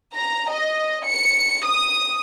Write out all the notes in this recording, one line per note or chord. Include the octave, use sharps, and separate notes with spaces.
A#5
D#5
C#7
D#6